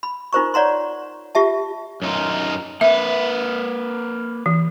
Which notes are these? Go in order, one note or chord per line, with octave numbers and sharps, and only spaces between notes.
B5
D#4 F4 A#4 C5 A#5 C#6
C#5 D5 F#5 A#5 C6
F4 G4 E5 A5
F#2 D#4 F4
A#3 B4 E5
E3